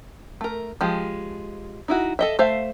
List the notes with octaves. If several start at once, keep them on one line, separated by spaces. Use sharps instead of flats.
A3 A#4
F3 G#3 G4
D#4 E4 F#4
A4 D#5 E5
A3 C5 E5 F5